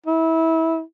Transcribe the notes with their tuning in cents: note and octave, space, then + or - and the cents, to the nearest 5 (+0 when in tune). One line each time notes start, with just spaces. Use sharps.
E4 -25